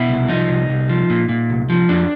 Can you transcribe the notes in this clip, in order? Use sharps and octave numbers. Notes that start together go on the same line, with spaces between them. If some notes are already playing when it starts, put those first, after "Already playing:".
Already playing: B2 E4
C2
F3 D#4
C2
C2
F3
A#2
A#2
C2
F3
F2 D4